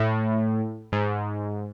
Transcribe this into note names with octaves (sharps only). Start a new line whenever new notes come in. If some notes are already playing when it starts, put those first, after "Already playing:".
Already playing: A2
G#2